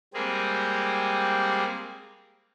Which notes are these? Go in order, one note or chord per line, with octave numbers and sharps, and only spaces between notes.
G3 G#3 A#3 C4 G4 G#4